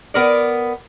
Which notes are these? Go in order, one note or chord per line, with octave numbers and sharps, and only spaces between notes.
B3 A#4 D5